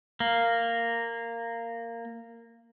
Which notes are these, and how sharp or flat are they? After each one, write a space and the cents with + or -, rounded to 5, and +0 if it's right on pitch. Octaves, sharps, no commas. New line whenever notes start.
A#3 -10